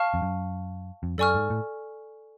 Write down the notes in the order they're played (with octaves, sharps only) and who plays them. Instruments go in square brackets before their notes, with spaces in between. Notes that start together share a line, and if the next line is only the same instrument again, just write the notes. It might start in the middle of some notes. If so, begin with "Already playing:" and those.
Already playing: [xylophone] F5 A5 C#6 F6
[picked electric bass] F2
F#2
F2
[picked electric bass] F#2 [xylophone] A4 D5 G#5 C#6 F6
[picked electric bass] G#2
A2